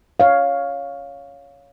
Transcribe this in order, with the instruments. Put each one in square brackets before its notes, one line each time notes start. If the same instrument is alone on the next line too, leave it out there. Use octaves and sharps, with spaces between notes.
[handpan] C#5 F5